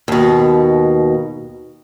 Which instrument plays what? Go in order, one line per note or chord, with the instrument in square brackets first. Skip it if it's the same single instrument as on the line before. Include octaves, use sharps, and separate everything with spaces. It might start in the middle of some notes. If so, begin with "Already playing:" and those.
[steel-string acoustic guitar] D#2 B2